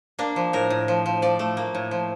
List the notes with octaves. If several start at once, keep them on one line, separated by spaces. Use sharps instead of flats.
A#3 D4
F3
A2 A#4
A2
F3
F3
F3 D5
A3
A#3
A2
F3